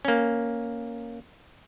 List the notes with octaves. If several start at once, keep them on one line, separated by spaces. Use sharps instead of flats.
A#3 C#4